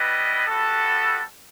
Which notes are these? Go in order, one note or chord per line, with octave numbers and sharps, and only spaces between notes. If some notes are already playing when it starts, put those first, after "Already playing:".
Already playing: G3 B3 E4 B4 D#5
G3 B3 F#4 A4